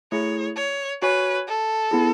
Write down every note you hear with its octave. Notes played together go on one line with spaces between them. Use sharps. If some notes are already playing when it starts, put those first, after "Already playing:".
A3 E4 G#4 C#5
C#5
F#4 B4 C#5 G#5
A4
B3 E4 G#4